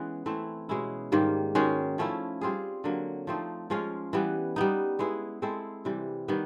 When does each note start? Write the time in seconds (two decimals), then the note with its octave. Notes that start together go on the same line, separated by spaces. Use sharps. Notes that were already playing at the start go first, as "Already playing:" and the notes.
Already playing: E3 G#3 B3 C#4
0.26 E3 A3 C4 E4
0.69 B2 G#3 C#4 E4
1.12 G#2 D#3 G3 A#3
1.55 D#3 G#3 C#4 F#4
1.98 F3 A3 C#4 E4
2.41 G3 C4 F4 G#4
2.84 D3 F#3 A#3
3.27 F3 A3 C4 D#4
3.70 F3 G#3 C#4 F4
4.13 E3 G3 B3
4.56 G3 B3 D#4
4.99 G#3 B3 E4 G#4
5.42 G#3 C4 E4 A4
5.85 C3 E3 G3
6.28 D#3 G3 B3